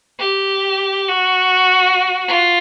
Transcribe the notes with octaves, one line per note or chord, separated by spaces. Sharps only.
G4
F#4
F4